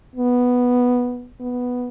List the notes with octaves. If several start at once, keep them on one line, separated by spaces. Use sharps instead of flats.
B3
B3